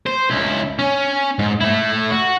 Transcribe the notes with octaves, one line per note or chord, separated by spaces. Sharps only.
C5
C#2 E4
C#4
G#2
A3 E4
F#4